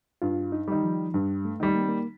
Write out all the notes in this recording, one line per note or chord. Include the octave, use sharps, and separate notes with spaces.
G2 F4
D#4
D#3 G3
F3
G2 G3
A3
D#3 G3
A#3
C4
A#3